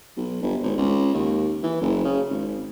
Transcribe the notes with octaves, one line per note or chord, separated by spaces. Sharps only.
B1
G1
G#1
C#2
D#2
E3
F#1
C#3
G#1